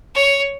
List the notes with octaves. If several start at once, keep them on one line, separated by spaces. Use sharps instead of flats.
C#5